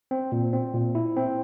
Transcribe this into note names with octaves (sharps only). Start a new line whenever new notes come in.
C4
A#2
C4
A#2
E4
C4